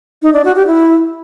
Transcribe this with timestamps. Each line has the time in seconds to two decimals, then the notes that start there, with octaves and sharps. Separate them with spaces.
0.22 D#4
0.33 D4
0.45 F#4
0.56 G4
0.67 E4